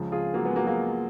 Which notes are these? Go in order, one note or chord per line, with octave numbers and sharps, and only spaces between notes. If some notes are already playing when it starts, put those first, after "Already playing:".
Already playing: C#2 C#3 F3
F4 G#4
F#3 A#3
G#3 B3
F#3 A#3
F#3 A#3